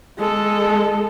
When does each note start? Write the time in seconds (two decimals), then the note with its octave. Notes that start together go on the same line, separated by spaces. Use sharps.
0.18 G#3 A4